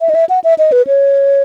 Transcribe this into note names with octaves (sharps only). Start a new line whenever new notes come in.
E5
D#5
E5
F#5
E5
D#5
B4
C#5